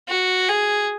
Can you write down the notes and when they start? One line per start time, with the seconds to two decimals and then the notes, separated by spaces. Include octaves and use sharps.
0.08 F#4
0.48 G#4